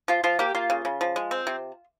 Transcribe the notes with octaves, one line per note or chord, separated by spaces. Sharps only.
F3 F4
F3 F4
A#3 G4
A#3 F4
C#3
C#3
F3
G#3
C4
C3